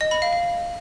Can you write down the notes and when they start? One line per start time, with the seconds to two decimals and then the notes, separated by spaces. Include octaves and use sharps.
0.01 D#5
0.11 B5
0.22 F5
0.33 F5